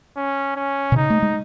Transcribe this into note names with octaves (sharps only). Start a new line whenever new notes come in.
C#4
C#4
B2
C#3 D#4
A3
G#3